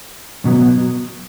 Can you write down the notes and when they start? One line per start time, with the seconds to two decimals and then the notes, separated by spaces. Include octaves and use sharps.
0.45 B2 F#3 B3